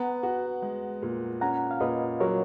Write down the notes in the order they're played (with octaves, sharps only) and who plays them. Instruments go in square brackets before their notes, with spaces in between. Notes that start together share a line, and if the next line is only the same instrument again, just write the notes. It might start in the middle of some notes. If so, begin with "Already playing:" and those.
Already playing: [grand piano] B3 [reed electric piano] F#5 A#5
[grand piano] F#4
G#3
A#2
[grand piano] C#4 [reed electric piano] F#5 A#5
[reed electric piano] F5
[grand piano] A#2 [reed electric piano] B4 D#5
[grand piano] F#3 [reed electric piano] A#4 C#5